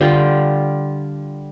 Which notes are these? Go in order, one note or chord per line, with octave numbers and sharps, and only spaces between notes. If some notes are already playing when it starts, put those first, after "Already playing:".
D3 G3 F4 G5